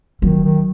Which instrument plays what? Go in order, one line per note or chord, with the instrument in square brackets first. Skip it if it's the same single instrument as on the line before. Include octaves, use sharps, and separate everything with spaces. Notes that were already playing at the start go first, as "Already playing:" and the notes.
[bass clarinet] D#3 [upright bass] F#3
[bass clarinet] D#3